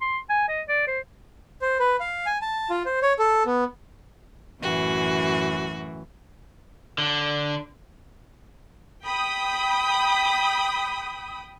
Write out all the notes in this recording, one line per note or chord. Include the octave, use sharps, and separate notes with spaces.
C6
G#5
D#5
D5
C5
C5
B4
F5
G#5
A5
F4
C5
C#5
A4
B3
F#2 A2 E3 F#4
D3
G5 B5 D#6